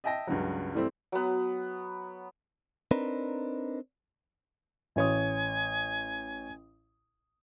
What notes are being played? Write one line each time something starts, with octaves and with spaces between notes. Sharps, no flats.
D#5 E5 G5 A5 A#6
C#2 G2 C#3 F#3
E3 G3 A3 C4 E4
F#3 B3
C4 D4 D#4 A#4 B4
A1 C#5 G#5 D#6